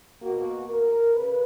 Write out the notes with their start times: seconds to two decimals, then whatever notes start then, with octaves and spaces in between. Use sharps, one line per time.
0.21 B2 A#3 F#4
0.69 A#4
1.15 C#3 B4